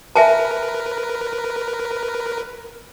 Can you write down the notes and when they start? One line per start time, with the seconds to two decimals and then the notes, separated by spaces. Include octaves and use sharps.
0.16 A#4 B4 E5 G#5 A5